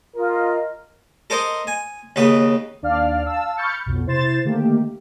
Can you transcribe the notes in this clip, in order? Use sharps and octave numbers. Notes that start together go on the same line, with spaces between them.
F4 A#4 D#5
A4 A#4 C5 D#5 D#6
G#5
D#2 C#3 B4 D#5
D#2 D4 D5 F5 F6
F5 A5 E6
B5 C#6 F6 G6 A6 C#7
B1 F2 B2
C3 E4 C5 C6 A6 E7
D3 D#3 A3 A#3 G4